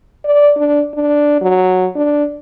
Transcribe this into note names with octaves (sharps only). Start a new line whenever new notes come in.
D5
D4
D4
F#3
D4